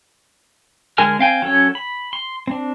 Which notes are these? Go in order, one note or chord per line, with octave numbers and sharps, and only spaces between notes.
D3 G#3 A#4 G#5 F6
C4 F5 G5 G#5
F#3 C#4 A4 C#5
B5
C6
C4 D4